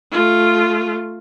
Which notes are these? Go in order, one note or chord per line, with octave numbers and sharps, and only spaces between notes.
A3 F4